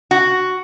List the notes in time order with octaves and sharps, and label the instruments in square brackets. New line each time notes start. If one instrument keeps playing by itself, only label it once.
[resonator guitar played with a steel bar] F#4